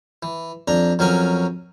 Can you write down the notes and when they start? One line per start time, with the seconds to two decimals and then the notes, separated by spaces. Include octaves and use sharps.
0.23 E3
0.68 F2 D4 A#5
0.99 F2 F#3 C#4 A#4 G#5